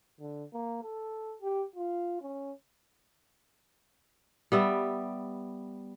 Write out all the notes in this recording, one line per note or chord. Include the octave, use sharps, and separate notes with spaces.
D3
A#3
A4
G4
F4
C#4
G3 B3 E5